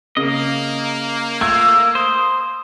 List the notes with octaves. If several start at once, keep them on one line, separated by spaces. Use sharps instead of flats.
C#3 A#3 D#5
A3 F4 E6 G#6
C5 D#6